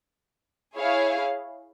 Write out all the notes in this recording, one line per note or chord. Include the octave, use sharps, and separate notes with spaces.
E4 G#4 C#5 F5